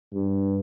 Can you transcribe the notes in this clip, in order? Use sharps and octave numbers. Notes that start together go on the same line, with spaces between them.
G2